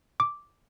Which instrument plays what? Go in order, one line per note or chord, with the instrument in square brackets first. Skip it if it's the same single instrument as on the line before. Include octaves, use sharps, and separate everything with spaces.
[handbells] D6